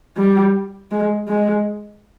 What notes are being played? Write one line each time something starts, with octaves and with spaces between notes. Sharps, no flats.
G3
G#3
G#3